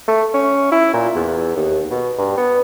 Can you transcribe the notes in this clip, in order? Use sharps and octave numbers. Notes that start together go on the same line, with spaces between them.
A3
C#4
E4
A#2
E2
D#2
B2
G2
B3